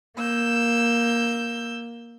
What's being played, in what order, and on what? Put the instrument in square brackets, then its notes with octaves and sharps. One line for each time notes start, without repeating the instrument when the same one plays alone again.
[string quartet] A#3 E6 G6